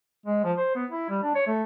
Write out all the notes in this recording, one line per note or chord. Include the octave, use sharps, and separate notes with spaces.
G#3
F3
C5
B3
E4
G3
D4
C#5
A3